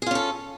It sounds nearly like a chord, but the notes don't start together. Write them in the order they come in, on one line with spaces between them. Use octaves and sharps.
G#4 F4 C#4 A4